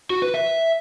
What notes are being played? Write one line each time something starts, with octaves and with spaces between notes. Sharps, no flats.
F#4
B4
E5